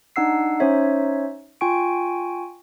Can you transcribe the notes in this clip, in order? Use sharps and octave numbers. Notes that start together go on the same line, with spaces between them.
D4 D#4 F#5 E6 C7
C#4 D#4 C5 C#5 E5
F4 G5 G#5 C#6 D7